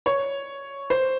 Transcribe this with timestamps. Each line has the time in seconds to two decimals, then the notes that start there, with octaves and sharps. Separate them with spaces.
0.06 C#5
0.90 C5